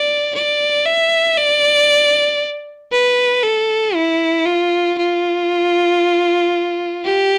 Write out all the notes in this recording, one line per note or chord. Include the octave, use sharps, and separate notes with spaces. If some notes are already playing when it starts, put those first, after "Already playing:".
Already playing: D5
D5
E5
D5
B4
A4
E4
F4
F4
G4